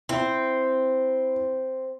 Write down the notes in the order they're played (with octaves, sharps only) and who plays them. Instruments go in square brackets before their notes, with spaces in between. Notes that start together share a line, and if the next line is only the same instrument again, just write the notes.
[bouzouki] C4 [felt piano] E4